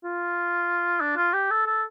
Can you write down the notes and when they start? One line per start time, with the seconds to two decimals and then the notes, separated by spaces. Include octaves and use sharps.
0.04 F4
1.01 D4
1.17 F4
1.33 G4
1.51 A4
1.66 A4